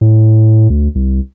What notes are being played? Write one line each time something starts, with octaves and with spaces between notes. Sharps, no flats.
A2
D2
C2